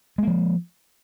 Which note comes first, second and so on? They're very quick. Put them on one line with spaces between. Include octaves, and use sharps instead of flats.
G#3 A#3 F3